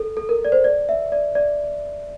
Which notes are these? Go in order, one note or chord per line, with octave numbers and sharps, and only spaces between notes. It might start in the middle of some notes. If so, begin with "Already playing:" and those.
Already playing: A4
A4
A#4
D5
C5
D5
E5
D5
D5